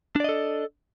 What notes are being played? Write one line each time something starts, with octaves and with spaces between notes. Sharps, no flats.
D4 A4 D5 D#5